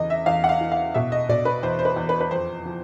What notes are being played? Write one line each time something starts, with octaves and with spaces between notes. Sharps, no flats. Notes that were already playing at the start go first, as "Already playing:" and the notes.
Already playing: E2 C#3 D#5
E5
E2 F5
F#5
F5
E3
F5
B2 E5
D#5
B2 D5
B4
E2 C5
C5
B4
E2
B4
B4
F2 C5
F3